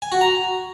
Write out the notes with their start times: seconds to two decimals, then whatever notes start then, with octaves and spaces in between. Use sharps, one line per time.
0.02 G#5
0.12 F#4
0.21 A#5